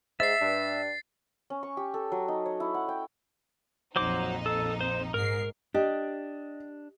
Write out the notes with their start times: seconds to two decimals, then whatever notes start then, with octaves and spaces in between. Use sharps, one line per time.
0.20 G#2 E5 A6 C7
0.41 G2 D4
1.50 C#4
1.63 C#6
1.77 G4
1.94 A4
2.12 F#3
2.28 D#4
2.46 C#5
2.60 E4
2.74 F#5
2.89 G5
3.96 A#1 F2 F#3 D#4 C5 D6
4.46 A4
4.81 C5
5.14 G#2 A#4 C7
5.74 D4 G4 D#5